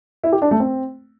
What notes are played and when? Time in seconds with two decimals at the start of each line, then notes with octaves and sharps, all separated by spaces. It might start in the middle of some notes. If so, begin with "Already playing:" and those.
0.23 E4
0.32 G4
0.42 D4
0.51 A3
0.60 C4